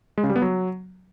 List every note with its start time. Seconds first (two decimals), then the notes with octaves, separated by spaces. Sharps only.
0.18 G#3
0.24 C#3
0.30 G3
0.36 B3
0.42 F#3